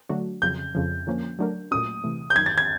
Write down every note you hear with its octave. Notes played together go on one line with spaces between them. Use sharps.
D3 F#3 A3 D4 F#4
F2 C#3 F#3 G6
F2 C#3 F3
D3 F3 A#3 C#4
F#3 A3 D4 F#4 A#4
A#2 F#3 A3 C#4 F#4 D#6
C3 E3 A3
G6
F#2 D#3 F#3 G#6
A6
G#6